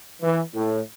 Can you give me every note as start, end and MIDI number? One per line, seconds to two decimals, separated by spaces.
0.22 0.42 52
0.55 0.80 45